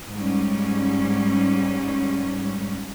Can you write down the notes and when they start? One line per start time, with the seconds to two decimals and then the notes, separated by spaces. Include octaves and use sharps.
0.13 G#2 G3 C#4